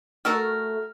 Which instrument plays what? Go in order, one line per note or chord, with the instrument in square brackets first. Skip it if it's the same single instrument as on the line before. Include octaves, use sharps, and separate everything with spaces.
[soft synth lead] A3 [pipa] F#4 A4 A#4 [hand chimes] F6